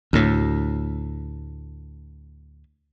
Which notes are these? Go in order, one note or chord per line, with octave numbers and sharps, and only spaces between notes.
D2 A2